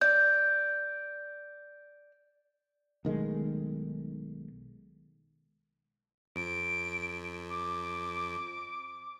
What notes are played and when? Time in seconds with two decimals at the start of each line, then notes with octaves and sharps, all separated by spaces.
0.01 D5 G6
3.05 B1 D#3 G#3 A3
6.36 F2 D7
7.50 D6